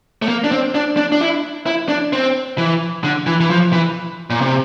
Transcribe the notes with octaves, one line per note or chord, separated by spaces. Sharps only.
A3
A#3
D4
C4
D4
D4
D4
E4
E4
D4
C4
E3
D3
E3
E3
F3
E3
A#2
C3